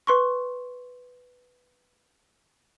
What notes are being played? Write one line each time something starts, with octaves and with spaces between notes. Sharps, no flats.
B4 C6 C#6